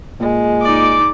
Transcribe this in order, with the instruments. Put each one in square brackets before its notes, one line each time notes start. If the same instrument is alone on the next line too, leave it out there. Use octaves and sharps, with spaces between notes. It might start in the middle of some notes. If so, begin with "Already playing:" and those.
[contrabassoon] A#2 [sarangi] G#3
[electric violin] D#4 D5 [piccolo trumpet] D6